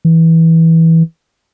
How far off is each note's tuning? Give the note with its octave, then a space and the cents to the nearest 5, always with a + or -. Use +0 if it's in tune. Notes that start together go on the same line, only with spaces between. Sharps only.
E3 -15